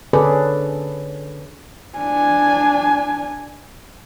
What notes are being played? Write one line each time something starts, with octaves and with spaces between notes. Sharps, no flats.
D3 C#4 G#4 A4 B4 D5
D4 G#5